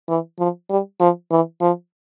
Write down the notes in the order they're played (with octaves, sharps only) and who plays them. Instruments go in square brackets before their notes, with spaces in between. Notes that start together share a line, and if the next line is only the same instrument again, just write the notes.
[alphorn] E3
F3
G3
F3
E3
F3